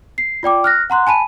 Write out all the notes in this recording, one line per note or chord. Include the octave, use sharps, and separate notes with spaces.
C7
F4 D5 G5 D6
F6 F#6 A#6
F#5 A#5 C6 F#6
G#5 A5 B5 D#7